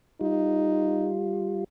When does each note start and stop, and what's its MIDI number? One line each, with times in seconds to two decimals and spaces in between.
0.21 1.64 55
0.21 1.12 63
0.21 1.64 65